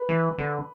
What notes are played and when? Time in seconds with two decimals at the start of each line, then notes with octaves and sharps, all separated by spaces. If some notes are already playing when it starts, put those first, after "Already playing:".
Already playing: B4
0.09 E3
0.38 D3